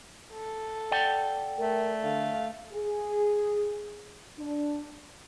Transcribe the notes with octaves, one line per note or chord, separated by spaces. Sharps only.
A4
D5 F#5 G5
A3 A#4
D3 F5
G#4
D4